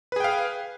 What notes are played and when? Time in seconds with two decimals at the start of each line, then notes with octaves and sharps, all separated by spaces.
0.12 B4
0.16 G#4
0.20 G5
0.24 F5